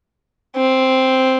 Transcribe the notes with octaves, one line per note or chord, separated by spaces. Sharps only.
C4